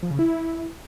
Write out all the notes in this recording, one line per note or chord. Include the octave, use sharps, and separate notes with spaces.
F3
C#3
E4